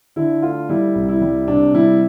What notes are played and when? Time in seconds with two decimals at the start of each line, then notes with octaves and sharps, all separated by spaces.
0.16 D3 E4
0.42 A3 F4
0.69 G3 E4
0.95 C2
1.08 E4
1.21 G3
1.48 C3 D4
1.74 G3 E4